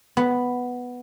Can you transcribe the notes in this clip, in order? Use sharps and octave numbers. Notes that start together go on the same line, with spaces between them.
B3